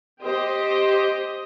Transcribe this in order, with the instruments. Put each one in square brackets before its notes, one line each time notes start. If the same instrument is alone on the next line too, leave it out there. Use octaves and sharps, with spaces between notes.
[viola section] G4 C5 D#5